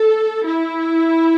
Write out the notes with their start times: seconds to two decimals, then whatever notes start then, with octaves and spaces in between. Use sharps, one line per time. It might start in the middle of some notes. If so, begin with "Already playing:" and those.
Already playing: A4
0.45 E4